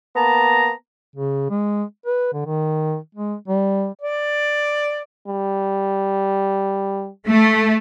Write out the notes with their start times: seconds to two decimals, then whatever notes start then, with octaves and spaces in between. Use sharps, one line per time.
0.16 A#3 B3 A5 A#5
1.16 C#3
1.50 G#3
2.06 B4
2.33 D3
2.46 D#3
3.15 G#3
3.48 G3
4.01 D5
5.28 G3
7.27 A3